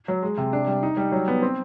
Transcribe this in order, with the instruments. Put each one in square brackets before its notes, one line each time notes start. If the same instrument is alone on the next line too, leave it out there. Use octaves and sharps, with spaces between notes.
[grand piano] F#3
G#3
C3
D4
G3
D#4
G3
F#3
B3
C4